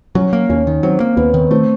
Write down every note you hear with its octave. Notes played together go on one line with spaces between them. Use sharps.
F#3 C#4
A#3
D#2 C#4
D#3
F#3 C4
A#3
D#2 B3
D#3
A3 C4